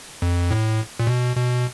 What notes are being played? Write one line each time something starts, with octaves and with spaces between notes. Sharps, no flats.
F2
A2
A#2
B2
B2